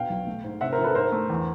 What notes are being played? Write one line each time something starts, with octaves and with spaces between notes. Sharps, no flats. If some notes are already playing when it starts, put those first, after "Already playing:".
Already playing: B2 F5 G5
B1
A3
G#2
C3 E5 F#5
A#4 C5
F3
A4 B4
G#2 A#4 C5
A3
E2